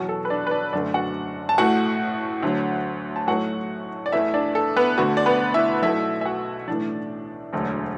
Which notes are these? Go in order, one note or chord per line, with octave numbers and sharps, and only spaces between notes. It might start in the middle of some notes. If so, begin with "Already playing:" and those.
Already playing: E2 B2 F#3 F#4
A4
B4
D4 D5
B4
D4 D5
F#1 F#2 D3 A3 D4 D5
F#4 F#5
A5
A1 A2 A3 F#4 F#5
D2 D3 F#3
A5
B1 A2 F#3 A3 F#4 F#5
D5
E2 E3 A3 E4 E5
D4 D5
A4
B3 B4
D2 D3 A3 F#4
D5
B3 B4
E4 E5
B1 B2 A3 E4 E5
E5
F#4 F#5
B1 A2 E3 A3 D4 D5
E1 D2 D3 F#3